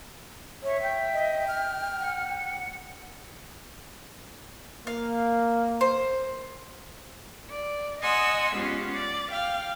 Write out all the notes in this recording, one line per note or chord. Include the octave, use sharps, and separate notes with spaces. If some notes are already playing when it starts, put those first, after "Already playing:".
C#5 E5
G5
D#5
F6
F#5
A#3 F5
C5
D5
D#5 F#5 G#5 C6 D#6 E6
G#3 B3 C#4 F4 G4
D5
F5 G5